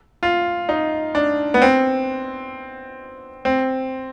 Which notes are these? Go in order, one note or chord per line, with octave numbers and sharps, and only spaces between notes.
F4
D#4
D4
B3
C4
C4